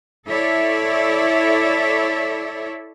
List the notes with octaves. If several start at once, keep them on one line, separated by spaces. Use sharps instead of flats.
E4 A4 C#5 D5 E5